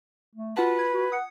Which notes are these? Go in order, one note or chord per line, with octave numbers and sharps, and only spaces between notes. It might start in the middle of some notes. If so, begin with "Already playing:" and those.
A3
F4 F#4 B4 F#5 A5
G#6
F#4
F#5 D#6 C#7